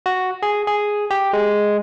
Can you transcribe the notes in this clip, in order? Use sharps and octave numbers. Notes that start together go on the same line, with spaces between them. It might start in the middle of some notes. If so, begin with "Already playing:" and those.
F#4
G#4
G#4
G4
G#3